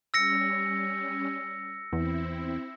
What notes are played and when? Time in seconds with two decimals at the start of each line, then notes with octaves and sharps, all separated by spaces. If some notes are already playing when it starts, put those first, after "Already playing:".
0.14 G3 C#4 E6 A#6 C#7
1.93 E2 C4 E4